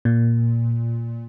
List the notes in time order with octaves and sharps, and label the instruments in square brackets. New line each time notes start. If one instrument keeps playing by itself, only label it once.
[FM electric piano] A#2